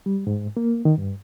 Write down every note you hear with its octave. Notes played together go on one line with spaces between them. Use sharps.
G3
G#2
A#3
D#3
G2